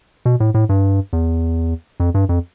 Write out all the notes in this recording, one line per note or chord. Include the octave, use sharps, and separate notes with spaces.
B2
A2
A2
G2
E2
F2
G2
F2